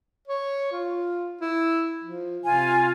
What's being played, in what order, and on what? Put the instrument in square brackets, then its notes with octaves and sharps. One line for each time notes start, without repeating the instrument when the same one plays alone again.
[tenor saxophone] C#5
F4
E4
F3
[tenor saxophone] C3 [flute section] F4 G#5